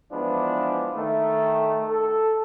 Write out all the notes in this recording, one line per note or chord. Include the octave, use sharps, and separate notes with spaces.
E3 F3 G#3 B3 D4
D#3 A3
A4